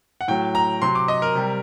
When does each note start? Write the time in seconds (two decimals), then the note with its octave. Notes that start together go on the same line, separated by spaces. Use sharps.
0.21 F#5
0.28 A2 F#3 G5
0.55 A#5
0.82 C3 F#3 C6
0.95 D6
1.08 D#5
1.22 A#4
1.35 C3 G3